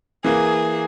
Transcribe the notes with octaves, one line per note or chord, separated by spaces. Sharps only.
E3 A#3 G#4